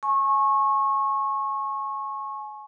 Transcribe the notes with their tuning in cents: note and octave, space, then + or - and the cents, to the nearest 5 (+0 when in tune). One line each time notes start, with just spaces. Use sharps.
G#5 +35 C#6 -25